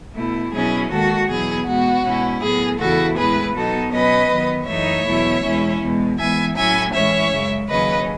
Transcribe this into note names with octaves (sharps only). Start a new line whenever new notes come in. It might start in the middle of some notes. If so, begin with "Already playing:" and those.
B2 A3 E4
B2 F#3 C#4 E4 G#4
D#2 D#3 G#3 F#4 A4
E2 B2 F#3 B3 E4 G#4
B2 G#3 B3 F#4
B2 G#3 C#4 E4
A2 F#3 B3 G#4
E2 C#3 E3 A3 E4 F#4 A4
A2 G#3 B3 E4 G#4 B4
B2 F#3 B3 D#4 F#4 A4
B2 F#3 C#4 B4 D#5
D#3 F#3 B3
F#2 E3 A3 D#4 C#5 E5
E2 B2 F#3 A3 E4
E2 B2 G#3 C#4 E4
E2 B2 G#3
G#2 E3 B3 E5 G#5
A2 F#3 C#4 E4 E5 G#5
A2 E3 G#3 C#4 C#5 E5
F#2 C#3 G#3
D#2 C#3 F#3 C#4 B4 D#5